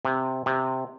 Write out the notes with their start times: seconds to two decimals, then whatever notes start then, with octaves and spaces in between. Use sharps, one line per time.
0.05 C3
0.46 C3